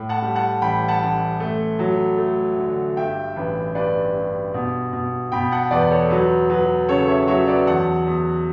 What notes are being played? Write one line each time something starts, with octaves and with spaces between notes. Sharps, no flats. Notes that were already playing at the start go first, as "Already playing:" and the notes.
Already playing: A2
F#5 A5
G3
F#5 A5
A1 G5 B5
F#5 A5
A1
A3
F#3
A3
D3
G2 E5 G5
A1 B4
G2 B4 D5
G2
B2
B2
B2 G5 B5
F#5 A5
E2 B4 D5
A4 C#5
F#3 B4
F#3 B4
C#3 A4 C#5
C#5 E5
F#3 C#5 E5
B4 D5
E2 F#5 A5
E2